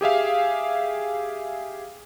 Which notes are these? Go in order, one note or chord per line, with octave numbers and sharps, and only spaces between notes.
G4 G#4 E5 F5